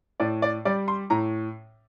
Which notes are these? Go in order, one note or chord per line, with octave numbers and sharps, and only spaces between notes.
A2 D5
D5
G3 D5
C6
A2 A#5